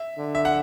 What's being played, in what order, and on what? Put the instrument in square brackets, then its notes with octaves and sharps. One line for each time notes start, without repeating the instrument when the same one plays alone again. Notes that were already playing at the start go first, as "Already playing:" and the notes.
Already playing: [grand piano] E5
[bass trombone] D3
[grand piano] E5
F#5